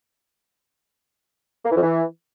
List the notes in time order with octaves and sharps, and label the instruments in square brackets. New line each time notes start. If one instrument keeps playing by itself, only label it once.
[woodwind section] A#3
E3
F2
E3